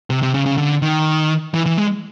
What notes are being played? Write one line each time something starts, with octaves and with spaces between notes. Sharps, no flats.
C3
C3
C#3
C#3
D3
D#3
E3
E3
G#3